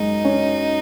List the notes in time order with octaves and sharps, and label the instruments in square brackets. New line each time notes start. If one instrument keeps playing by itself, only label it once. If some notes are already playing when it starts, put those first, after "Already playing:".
Already playing: [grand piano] F#2 G#3 [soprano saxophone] D#4
[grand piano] C#4